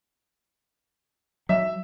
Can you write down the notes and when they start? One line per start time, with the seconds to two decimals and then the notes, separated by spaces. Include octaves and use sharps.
1.49 F#3 E5